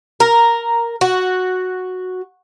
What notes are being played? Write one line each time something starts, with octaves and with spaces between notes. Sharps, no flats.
A#4
F#4